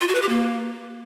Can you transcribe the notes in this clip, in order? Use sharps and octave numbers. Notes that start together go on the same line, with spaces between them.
F4
F#4
B4
G4
A#3